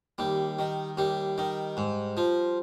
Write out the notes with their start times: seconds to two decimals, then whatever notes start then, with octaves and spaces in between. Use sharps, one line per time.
0.18 D#2 G3
0.59 D#3
0.97 D#2 G3
1.38 D#3
1.77 G#2
2.17 F3